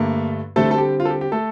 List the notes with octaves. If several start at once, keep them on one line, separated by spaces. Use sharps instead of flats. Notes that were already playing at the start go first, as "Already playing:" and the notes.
Already playing: G2 D3 A3 A#3
D3 G3 A3 C4 A4
A4
G4
F4
A4
G4
G4
A3 A4